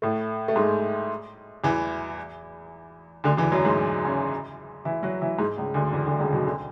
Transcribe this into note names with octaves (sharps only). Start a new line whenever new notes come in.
A2 A3
A3
G#2 G#3
E2 E3
D2 D3
E2 E3
F#2 F#3
G#2 G#3
C#3 C#4
E3 E4
F#3 F#4
E3 E4
G#2 G#3
C#2 C#3
D2 D3
E2 E3
D2 D3
C#2 C#3
B1 B2
D2 D3